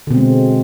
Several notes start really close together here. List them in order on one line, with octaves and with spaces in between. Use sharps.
D3 B2 C4 G#3